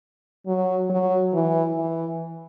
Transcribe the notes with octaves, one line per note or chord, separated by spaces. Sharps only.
F#3
F#3
E3
E3